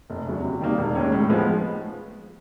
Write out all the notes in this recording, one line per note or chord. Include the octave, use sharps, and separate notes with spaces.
F1
E2 C#3 F#3
C3
D#3 G3 A#3 D#4
E1
D#2 D#3 G#3 C#4
A2
F3 G#3 B3